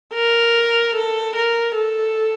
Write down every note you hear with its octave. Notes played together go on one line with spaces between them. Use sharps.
A#4
A4
A#4
A4